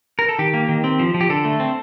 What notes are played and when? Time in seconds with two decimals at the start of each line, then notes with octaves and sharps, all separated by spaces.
0.19 A#4
0.29 A4
0.39 D#3 G4
0.54 A#3
0.69 D#3
0.84 C4
0.99 F3
1.14 F3
1.21 G4
1.29 D3 A4
1.45 A3
1.60 C4